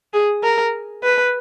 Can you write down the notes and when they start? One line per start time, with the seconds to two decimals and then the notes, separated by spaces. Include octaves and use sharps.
0.13 G#4
0.43 A#4
1.03 B4